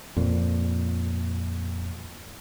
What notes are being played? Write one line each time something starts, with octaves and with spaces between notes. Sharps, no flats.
F2 A#2